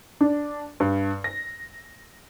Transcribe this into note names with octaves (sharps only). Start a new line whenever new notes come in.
D4
G2
A#6